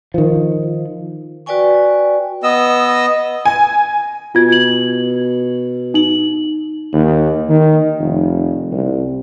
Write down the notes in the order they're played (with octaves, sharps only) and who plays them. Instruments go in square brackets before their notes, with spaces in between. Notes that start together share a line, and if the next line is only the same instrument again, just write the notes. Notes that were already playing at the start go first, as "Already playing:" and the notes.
[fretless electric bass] D#3 F3
[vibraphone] F#4 B4 D5 G5 G#5 C#6
[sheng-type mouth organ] B3 D#5 E6
[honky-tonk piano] G#5
[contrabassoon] B2 [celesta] F4 G#6
[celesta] F#7
D#4 F#7
[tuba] D#2
D#3
F1
C2